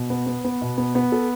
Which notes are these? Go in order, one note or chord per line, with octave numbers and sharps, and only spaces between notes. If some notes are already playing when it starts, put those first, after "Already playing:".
Already playing: B2
B3
B3
B3
B2
B3
B3
A4